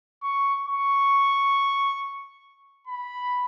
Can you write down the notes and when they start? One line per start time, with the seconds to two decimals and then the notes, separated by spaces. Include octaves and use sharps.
0.23 C#6
0.66 C#6
2.87 B5